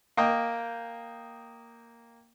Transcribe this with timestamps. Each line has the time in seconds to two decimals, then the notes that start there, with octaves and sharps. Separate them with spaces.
0.17 A#3 D#5 G5